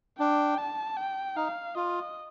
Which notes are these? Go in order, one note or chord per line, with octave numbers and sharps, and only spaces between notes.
D4 G5
A5
G5
D#4 F5
F4 D#5